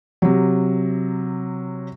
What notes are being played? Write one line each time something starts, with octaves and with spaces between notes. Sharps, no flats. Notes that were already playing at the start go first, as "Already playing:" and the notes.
C3 F#3